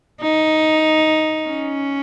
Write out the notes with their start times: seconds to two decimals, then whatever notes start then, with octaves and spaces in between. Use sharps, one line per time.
0.22 D#4
1.48 C#4